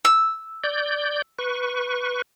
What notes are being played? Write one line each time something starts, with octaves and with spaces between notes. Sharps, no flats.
E6
D5 G6
B4 C#6